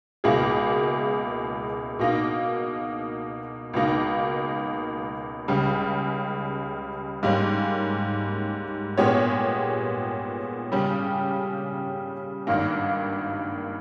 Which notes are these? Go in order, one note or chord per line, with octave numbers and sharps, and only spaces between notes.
C#2 B2 A#3 E4 G#4
B2 A#3 D#4
C#2 B2 A#3 D#4
C#2 C#3 G3
G#2 G3 A#3 C#4
A#2 G#3 B3 G4 C#5
C#3 G3 C#4 G4
G#1 G2 D#3 A#3